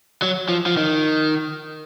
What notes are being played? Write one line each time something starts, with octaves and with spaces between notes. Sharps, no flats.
F#3
F3
F3
D#3